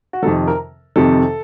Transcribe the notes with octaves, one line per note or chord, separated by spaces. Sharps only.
F#4
F2 C3 D#3 A4
A#4
F2 C3 D#3 A4